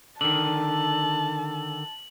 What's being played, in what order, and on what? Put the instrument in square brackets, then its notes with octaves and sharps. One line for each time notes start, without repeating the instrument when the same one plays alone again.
[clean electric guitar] D3 D#3 [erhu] A5 [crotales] F#7